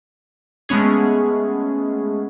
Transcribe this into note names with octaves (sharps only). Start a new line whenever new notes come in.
G#3 A3 B3 C#4 G#4